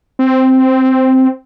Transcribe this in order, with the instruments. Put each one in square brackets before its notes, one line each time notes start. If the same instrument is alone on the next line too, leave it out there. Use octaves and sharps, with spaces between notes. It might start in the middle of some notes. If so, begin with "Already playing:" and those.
[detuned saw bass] C4